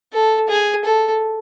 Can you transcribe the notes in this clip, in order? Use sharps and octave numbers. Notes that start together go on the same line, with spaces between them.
A4
G#4
A4